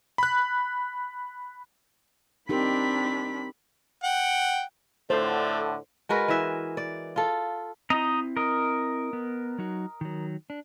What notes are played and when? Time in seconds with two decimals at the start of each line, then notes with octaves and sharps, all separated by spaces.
0.18 B5 F#6
2.49 C4 D4 D#4 G4 A#4 B5 B6
4.03 F#5 G5
5.10 A2 D3 A3 C5
6.09 G#3 F#4 A#4 B4
6.28 E3 E5
6.77 D5
7.16 F4 A4
7.90 C4 D#4 E4 D#5 A#5
8.37 A#4 D#5
9.13 B3
9.58 F#3 D#4 F#4
10.01 D#3 F#3
10.50 D4